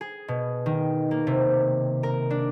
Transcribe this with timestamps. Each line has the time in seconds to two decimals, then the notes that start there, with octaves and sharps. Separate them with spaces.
0.01 G#4
0.28 B2
0.66 D#3
1.11 A#3
1.27 C3
2.03 A#4
2.30 D4